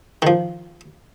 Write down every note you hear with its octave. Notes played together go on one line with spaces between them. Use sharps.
D#3 F3